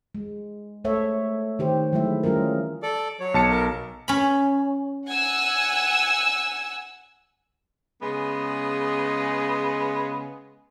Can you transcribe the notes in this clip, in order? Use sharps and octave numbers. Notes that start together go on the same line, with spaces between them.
G#3
A3 A4 C#5 E5
D#3 G4 C5
E3 F#3 G#3 A3 E4 E5
G3 C#4 F4 G#4 A#4
A4 D5 D6
F#3 C#5
B1 A5 C#7
A#4
C#4 B5
F#5 G#5 E6
C#3 G#3 B3